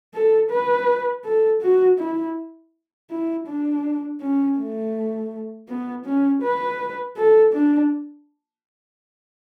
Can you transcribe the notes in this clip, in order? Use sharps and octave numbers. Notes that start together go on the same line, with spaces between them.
A4
B4
A4
F#4
E4
E4
D4
C#4
A3
B3
C#4
B4
A4
D4